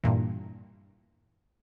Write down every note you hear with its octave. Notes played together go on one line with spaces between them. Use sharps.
G2 A#2 E3